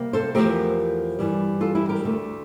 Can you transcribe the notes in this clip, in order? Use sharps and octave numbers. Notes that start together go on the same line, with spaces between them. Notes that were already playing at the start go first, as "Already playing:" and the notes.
Already playing: C3 G3 A#3
A4 C5
E2 D3 F3 A3 C4 G4 A#4
G2 E3 G3
F4 A4
E4 G4
G4 A#4
D2 D3 A3